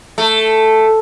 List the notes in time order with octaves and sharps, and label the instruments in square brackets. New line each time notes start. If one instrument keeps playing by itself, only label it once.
[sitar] A3